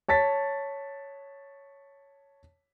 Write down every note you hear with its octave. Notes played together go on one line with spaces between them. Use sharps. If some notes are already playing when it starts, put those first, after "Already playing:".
C#5 A5 A6 B6